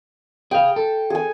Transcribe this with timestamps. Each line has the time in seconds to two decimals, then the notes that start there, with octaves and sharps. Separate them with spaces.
0.51 G#4 F5 G5
0.76 A4
1.10 G#4 G#5